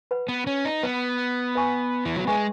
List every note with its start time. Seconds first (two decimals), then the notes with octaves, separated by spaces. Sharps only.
0.11 B4 F#5 B5
0.29 B3
0.47 C#4
0.65 D#4
0.83 B3 B4 F#5 B5
1.55 B4 E5 G#5 C#6
2.05 E3
2.16 F#3
2.27 G#3 B4 E5 G#5 C#6